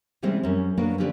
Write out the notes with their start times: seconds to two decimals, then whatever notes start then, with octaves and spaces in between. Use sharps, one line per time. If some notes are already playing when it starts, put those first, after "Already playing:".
0.22 C3 E3 G3 G#3 C4 C#4
0.43 F#2 C#4
0.78 F#3 A#3 B3 D4 F#4 B4
0.98 D3 F3 C#4 G4 B4 D5